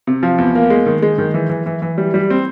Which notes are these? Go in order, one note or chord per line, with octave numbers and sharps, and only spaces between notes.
C3
F3
E2
A#3
G#3
D#3
G#3
D#3
E3
E3
E3
E3
G3
G3
C4